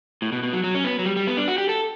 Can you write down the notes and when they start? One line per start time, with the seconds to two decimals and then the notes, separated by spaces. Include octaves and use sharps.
0.22 A2
0.32 B2
0.43 B2
0.53 F#3
0.64 F#3
0.75 C#4
0.84 B3
0.99 F#3
1.06 G3
1.16 G3
1.27 B3
1.37 D4
1.48 F#4
1.58 G4
1.69 A4